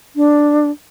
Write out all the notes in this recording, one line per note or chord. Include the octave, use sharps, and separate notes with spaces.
D4